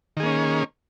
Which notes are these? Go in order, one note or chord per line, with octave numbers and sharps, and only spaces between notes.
D#3 A#3 C#4 G#4